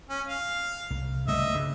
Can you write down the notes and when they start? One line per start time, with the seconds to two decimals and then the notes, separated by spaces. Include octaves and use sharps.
0.10 C#4
0.28 F5
0.90 C2
1.28 C#2 G3 A3 D#5 E5
1.53 G2 C#3